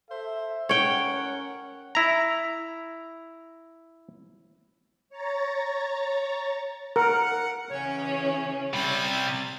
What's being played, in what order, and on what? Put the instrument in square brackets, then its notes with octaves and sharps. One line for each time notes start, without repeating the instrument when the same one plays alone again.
[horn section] A4 C5 E5
[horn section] C#4 A#4 F#5 [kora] C#5 G5
[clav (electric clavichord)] E4 A#5
[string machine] C#5 A#5 A6
[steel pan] A#4 [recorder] F#5
[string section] C#3 E3 C#4 [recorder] C#5
[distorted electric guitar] C3 G3 [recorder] B5 [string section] A6